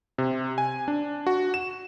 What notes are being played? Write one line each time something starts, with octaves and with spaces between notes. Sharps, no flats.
C3
G#5
D4
F#4
E7